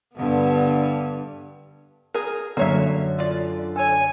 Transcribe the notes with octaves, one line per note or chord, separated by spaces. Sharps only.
G2 D3 B3
G#4 A#4
F#2 D3 A#3 C#5 E5
F4 D5
A4 C#5 G#5